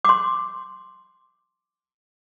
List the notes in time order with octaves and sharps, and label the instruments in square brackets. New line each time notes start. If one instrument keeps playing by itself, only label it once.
[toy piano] C6 D6